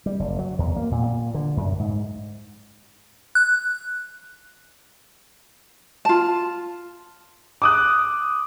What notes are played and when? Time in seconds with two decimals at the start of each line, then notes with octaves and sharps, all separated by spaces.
0.06 G3
0.19 F#1
0.39 F#3
0.59 E2
0.76 A#3
0.91 A#2
1.03 A#2
1.34 D3
1.57 F#2
1.79 G#2
3.35 F#6
6.05 F4 A5
7.62 D6 D#6 F#6